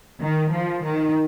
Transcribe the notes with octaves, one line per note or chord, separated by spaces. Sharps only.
D#3
F3
D#3